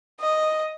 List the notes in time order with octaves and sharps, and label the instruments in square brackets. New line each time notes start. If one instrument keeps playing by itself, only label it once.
[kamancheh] D#5